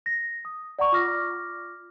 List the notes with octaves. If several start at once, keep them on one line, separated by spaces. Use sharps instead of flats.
A#6
D#6
D5 F#5 A#5 C#6
F4 D6 F6 A#6